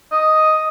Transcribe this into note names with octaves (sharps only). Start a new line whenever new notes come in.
D#5